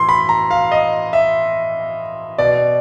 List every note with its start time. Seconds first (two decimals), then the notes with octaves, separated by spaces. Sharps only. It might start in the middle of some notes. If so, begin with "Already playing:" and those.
Already playing: A2 E3 C6
0.09 B5
0.29 A#5
0.51 F5
0.71 D#5
1.13 E5
2.38 B2 D5